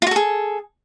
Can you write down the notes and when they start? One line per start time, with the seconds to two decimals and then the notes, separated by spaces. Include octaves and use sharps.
0.02 F4
0.07 F#4
0.11 A4
0.16 G#4